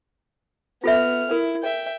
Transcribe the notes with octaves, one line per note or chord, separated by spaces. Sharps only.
B3 F4 A4 E5 F6
E4 A#4
E5 G5